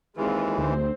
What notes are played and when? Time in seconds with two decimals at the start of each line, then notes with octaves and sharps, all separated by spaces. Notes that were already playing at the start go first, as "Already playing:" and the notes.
0.17 D#2 E3 G#3 C4 F4
0.58 D2 C4 C5